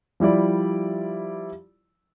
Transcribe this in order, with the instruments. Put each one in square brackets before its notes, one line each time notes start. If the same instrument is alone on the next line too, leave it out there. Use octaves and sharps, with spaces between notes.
[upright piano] F3 G3 E4 D5